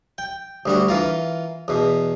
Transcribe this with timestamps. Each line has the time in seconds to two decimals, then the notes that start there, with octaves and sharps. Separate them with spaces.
0.18 G5
0.66 D2 G3 F#4
0.88 E3 F4 A#4
1.68 E2 B2